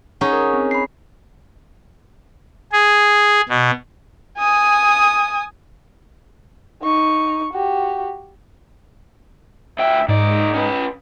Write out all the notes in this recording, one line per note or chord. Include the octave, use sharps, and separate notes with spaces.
C#4 D#4 G#4 F#5 C#6
A#4
C4
B5 C7
G#4
B2
G#5 D#6
D#4 C#6
F#4 G4
D2 E5 G5
D#2 G#2 D#4 D5
C#4 B4